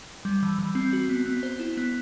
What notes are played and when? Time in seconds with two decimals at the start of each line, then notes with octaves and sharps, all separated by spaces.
0.25 G3
0.43 E3
0.59 E3
0.75 C4
0.93 F#4
1.09 B3
1.26 B3
1.43 C5
1.60 E4
1.77 B3